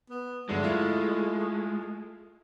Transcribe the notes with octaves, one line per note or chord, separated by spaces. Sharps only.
B3
G2 D3 F#3 G#3 A3
E4 F4 E5